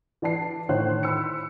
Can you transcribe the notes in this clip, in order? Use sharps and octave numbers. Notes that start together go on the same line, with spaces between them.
E3 D5 A5 C7
A2 D#3 C5 C#5 F#6
B5 C6 E6 C#7